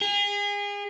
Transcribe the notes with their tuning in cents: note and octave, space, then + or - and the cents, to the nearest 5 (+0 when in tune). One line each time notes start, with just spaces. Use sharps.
G#4 -35